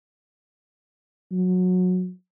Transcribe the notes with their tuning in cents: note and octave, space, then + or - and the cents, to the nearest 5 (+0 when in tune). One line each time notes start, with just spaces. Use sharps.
F#3 -20